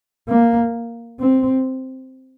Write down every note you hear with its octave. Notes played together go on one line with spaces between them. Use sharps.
A#3
C4